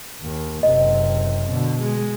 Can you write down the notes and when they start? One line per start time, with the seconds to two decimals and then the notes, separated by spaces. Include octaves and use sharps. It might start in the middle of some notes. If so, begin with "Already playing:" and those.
0.21 D#2
0.63 F#1 C3 D#5
1.50 B2 D3
1.81 G#3